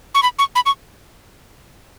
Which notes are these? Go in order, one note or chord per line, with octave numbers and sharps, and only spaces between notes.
C#6
B5
C#6
B5
C#6